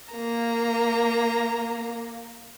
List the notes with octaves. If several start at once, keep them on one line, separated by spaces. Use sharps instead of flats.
A#3 A#5